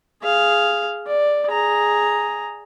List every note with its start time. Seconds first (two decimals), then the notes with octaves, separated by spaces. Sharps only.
0.23 G#4 F5
1.07 D5
1.48 G#4 A#5